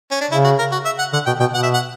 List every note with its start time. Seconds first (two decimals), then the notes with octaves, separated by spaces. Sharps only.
0.11 C#4
0.21 D4
0.31 C#3 E4
0.44 F#4
0.58 A#4
0.72 F#4
0.85 E5
0.99 F#5
1.13 D3 F#5
1.26 B2 G5
1.40 B2 G5
1.54 B2 F#5
1.63 E5
1.74 F#5